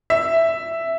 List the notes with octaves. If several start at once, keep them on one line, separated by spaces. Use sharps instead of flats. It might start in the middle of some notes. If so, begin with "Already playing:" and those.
E5